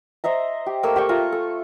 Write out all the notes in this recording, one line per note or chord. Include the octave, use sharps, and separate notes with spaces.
C5 D#5 E5 A#5
G4
A3 A#3 A#4 E6
G4 G5 C#6
A3 F4 G#5 A#5
A4